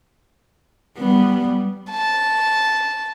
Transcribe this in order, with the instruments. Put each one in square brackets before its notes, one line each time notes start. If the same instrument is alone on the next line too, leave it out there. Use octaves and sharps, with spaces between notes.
[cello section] G3 [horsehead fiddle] B3
[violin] A5